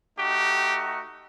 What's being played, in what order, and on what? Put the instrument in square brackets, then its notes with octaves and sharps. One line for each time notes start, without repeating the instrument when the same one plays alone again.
[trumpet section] A3 D#4 F#4 G4